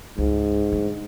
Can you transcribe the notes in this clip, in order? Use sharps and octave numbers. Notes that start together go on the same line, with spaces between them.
C#2 G#2
D3